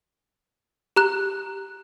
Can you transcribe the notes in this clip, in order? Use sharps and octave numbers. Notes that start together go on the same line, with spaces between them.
G4 A#5 F#6